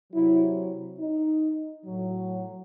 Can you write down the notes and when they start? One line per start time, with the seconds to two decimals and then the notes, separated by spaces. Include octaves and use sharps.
0.12 C3 F#3 E4
0.99 D#4
1.85 A2 F#3